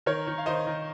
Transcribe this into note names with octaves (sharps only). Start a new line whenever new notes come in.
D#3 A#4 C#5
D#3
F5
D#3 C5 D#5
D#3